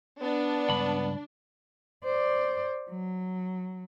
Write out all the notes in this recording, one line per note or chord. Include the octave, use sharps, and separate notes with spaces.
B3 D4
C#2 G2 B5
C5 D5
F#3